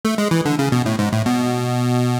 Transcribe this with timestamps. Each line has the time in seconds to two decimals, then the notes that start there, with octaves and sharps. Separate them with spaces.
0.05 A3
0.18 G#3
0.31 E3
0.45 D3
0.59 C#3
0.72 B2
0.86 A2
0.99 G#2
1.12 A2
1.26 B2